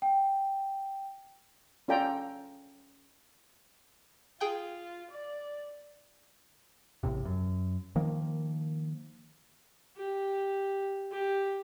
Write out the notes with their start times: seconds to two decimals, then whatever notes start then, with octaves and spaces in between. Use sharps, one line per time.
0.02 G5
1.88 C#4 F4 A4 D5 G5 A#5
4.40 F4 G#4 G5 G6
5.10 D5
7.03 A1 E2 A2 C3
7.25 F#2
7.96 D#3 F3 A#3
9.96 G4
11.11 G4